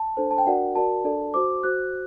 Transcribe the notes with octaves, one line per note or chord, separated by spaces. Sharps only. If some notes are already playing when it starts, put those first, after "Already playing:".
Already playing: A5
D4 A4 C5
A5
G5
D4 F#4 A#4 D5 F#5
F#4 A#4 D5 A5
D4 A4 D5
F#4 C5 D6
F#4 C5 F#6